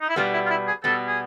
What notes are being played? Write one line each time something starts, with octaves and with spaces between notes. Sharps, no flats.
D#4
E4
B2 G3 B3 F4
E4
F4
E4
G#4
B2 G3 B3 A4
G#4